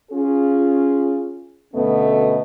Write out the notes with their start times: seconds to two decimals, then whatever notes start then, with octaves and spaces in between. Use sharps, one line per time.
0.11 C#4 F4 G#4
1.74 D2 B2 A3 B3 C#4 D#5